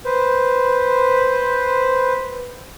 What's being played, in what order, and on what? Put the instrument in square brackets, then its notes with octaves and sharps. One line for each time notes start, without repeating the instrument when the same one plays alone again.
[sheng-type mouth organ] B4 C5